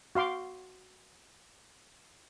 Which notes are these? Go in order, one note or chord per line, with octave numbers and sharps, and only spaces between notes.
F#4 F5 C6 D6